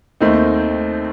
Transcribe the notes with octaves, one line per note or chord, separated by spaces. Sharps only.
D#2 D#3 A3 C4 D#4